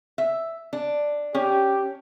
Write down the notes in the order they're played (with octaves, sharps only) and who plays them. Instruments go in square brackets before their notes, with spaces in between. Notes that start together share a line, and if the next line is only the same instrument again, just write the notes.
[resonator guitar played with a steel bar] E5
D4
[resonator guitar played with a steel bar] C#4 [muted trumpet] G4